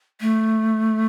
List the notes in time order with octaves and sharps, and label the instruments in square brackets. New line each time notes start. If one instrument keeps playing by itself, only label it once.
[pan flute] A3